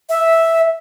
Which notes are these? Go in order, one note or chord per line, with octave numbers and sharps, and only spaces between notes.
E5